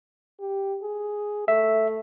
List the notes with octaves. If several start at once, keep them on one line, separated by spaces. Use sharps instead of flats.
G4
G#4
A3 E5